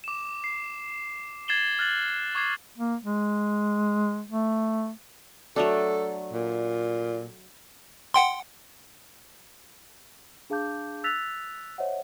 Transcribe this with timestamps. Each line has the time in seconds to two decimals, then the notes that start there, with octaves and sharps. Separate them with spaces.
0.04 D6 E7
0.44 C7
1.48 G#6 A6 C7 E7 F#7 G7
1.79 F6 F#6 G#6 A6 F#7
2.35 C#6 D6 G#6 C7
2.78 A#3
3.04 G#3
4.30 A3
5.56 F#3 A3 D4 A4
6.33 A#2
8.14 F#5 G5 C6
10.50 D4 G#4 F5 A5 D6 G6
11.04 E6 F#6 A6 B6 F7
11.78 C5 C#5 D#5 E5 F#5